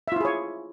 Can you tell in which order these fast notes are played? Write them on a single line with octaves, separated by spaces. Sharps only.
E5 F4 E4 G#4 C#5